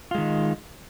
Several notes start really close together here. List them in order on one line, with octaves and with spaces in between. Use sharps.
F4 G#3 D#3